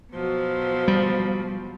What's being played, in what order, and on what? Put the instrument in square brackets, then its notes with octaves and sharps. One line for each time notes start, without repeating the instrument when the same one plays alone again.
[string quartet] B2 F3 F#3
[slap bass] G3